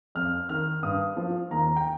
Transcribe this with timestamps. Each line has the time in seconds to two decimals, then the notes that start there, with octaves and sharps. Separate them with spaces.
0.15 F2 F6
0.49 D#3 F6
0.83 G2 D#6
1.17 F3
1.50 D#2 A#5
1.76 G5